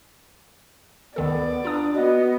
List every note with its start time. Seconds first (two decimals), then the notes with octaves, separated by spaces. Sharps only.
1.16 D2 D#3 B3 A4 D5
1.65 D4 F4 A#5 D#6
1.95 B3 F#4 D#5